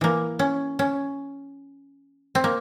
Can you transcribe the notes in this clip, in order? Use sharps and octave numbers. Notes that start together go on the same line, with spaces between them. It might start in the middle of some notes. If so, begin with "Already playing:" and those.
E3 A#3
C#4
C#4
C4
A#3